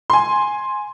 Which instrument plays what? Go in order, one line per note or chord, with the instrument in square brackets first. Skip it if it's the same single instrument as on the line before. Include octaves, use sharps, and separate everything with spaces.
[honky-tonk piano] G#5 C6